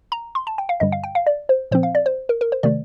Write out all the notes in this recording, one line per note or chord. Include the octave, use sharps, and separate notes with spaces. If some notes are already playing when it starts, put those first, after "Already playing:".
A#5
C6
A5
G5
F5
G2 D3 G3 D#5
F5
G5
F5
D5
C5
A#2 F3 C4 C5
F5
D5
C5
A#4
A#4
C5
C3 D#3 A3 D5